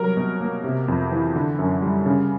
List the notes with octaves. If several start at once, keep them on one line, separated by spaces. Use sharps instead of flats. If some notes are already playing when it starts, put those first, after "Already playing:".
Already playing: C3 F#3 G3 A#4
B2
A#3
C3
F2
E3
D3
F#2
G3
C#3